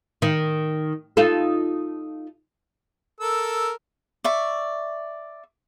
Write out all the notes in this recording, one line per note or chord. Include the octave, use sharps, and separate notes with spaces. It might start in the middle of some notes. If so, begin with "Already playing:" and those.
D#3
D#4 F4 A4
A4 A#4 E6
D5 E5 C#6